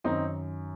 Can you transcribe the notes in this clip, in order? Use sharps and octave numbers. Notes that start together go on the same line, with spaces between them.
F#2 D#3 C4 D#4